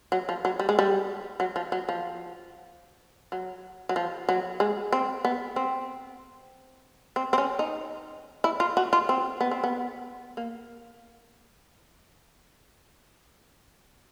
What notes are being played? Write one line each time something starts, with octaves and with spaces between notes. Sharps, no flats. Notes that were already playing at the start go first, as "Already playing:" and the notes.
F#3
F3
F#3
G3
G#3
G3
F#3
F3
F#3
F3
F#3
F#3
F3
F#3
G#3
C4
B3
C4
C4
C4
C#4
D#4
E4
F4
F#4
F4
C4
B3
C4
B3
A#3